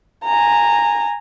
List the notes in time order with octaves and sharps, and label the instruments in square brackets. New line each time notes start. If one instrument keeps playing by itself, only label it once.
[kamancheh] G#5 A#5